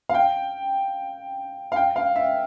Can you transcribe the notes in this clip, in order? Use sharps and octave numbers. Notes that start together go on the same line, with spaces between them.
F5
G5
F5
G5
F5
E5